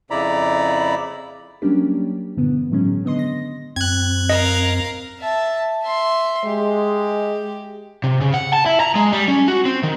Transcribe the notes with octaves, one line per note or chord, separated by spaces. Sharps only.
F2 C#3 E4 D5 A#5 B5
F#3 G3 A#3 C#4 D4 G4
G2 A#2 D3 E3 B3
A2 D#3 F#3 G#3 C#4
D3 B3 D#5 C6
A#6
F#2 C4 F#6 G#6
A#4 D#5 F5
E5 A5
E5 C6
G#3 G4
C3
C#3
F#5
A5
E4
A#5
G#3
G3
C#4
F#4
C4
D#3